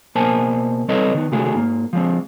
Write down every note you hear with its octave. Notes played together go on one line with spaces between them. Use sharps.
B2 A#3 A#4 C5 G#5 A5
G3 C4 A4 B4 C#5 D#5
D#3 B3
C3 D#3 G#3 A3 F#4 G#4
G#2 A#3
F3 G#3 C4